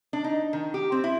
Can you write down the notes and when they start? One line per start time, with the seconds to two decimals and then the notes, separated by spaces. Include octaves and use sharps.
0.13 D4
0.24 D#4
0.53 D#3
0.74 G4
0.92 C4
1.04 E4